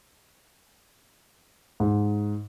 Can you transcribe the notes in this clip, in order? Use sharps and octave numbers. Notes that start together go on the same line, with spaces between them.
G#2